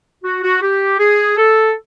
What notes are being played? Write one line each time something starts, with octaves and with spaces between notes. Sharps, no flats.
F#4
F#4
G4
G#4
A4